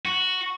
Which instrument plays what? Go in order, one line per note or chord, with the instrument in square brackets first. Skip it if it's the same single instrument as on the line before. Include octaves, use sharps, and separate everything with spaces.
[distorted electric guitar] F#4